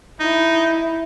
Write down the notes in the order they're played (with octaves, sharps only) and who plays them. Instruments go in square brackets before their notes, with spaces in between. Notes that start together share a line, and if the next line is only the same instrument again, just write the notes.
[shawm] D#4 [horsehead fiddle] E4